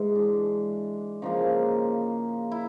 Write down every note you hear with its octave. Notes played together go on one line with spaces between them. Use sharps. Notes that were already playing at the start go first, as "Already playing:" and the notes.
Already playing: G#2 E3 G#3
D4
C#3 F3 A#3 D#4
E4